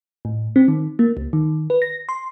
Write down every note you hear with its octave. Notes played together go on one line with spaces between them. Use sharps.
A2
C4
D#3
A#3
C#2
D#3
B4
A#6
C6